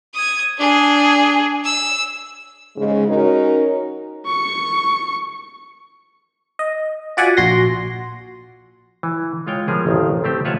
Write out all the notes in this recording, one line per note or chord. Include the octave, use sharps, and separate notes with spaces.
D#6 G#6
D4 G#4
E6
G#2 C#3 G#3
C#4 D#4 F#4 A#4
C#6 C#7
D#5
F4 F#4 D5 E5 F#5 G#5
A#1 F#4 C6 A#6
E3
G#3 F4 C#5 G5
F3 G3 B3 G#4 A#4
A1 F2 D#3
A3 C4 G4 C5
F4 B4 C#5 E5 F#5 A5